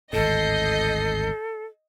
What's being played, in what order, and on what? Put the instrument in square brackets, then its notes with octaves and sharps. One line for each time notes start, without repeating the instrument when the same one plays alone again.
[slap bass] G#1 D2 A2 [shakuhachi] A4 [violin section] D#5 G6 C7